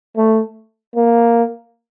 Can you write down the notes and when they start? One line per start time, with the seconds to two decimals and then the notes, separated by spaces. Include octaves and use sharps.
0.17 A3
0.96 A#3